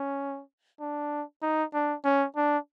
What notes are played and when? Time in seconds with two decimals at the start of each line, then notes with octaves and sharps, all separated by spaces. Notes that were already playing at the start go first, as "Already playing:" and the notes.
Already playing: C#4
0.80 D4
1.42 D#4
1.74 D4
2.04 C#4
2.36 D4